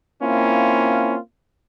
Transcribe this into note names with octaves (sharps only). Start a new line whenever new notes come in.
A#3 C4 C#4 E4 F4